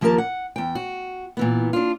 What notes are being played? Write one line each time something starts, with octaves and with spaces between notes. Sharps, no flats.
D#2 F3 A#3 G4 A#4 A5
F#5
E2 G5
F#4
A#2 E3 B3
D4 F4